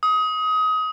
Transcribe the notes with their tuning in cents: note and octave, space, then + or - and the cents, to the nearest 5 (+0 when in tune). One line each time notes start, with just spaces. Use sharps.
D#6 +25